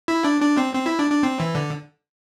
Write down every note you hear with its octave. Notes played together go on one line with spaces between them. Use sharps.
E4
D4
D4
C4
C4
E4
D4
D4
C4
E3
D3